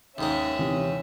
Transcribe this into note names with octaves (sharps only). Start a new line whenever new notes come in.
D#2 G#2 G#3 C#4 E5
C3 E3